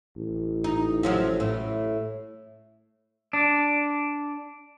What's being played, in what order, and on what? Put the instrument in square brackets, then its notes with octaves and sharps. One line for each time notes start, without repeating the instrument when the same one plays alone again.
[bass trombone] A1
[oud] D#4
C3 F3 F#3
A2
[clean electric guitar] D4